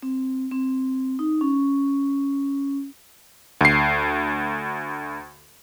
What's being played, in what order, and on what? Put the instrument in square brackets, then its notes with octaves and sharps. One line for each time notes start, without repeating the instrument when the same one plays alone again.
[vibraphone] C4
C4
D#4
C#4
[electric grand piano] D2 C7